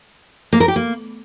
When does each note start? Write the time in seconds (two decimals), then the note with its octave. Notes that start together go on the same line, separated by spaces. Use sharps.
0.53 A#3
0.60 A#4
0.68 G4
0.76 A#3